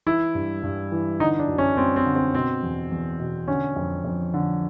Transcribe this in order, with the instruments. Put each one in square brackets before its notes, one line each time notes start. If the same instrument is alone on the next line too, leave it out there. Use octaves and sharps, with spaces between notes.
[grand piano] E3 E4
G2
G2
E3
D3 D#4
D4
F#2
C#4
F#2 C4
C4
D3
C4
B2 C4
E2
E2
B2
D3 C#4
F2
F2
D3